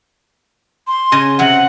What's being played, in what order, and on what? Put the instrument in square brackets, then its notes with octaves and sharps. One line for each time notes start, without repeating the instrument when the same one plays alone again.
[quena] C6
[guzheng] C#3 D#5 G#5
[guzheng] C3 F#3 [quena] F#5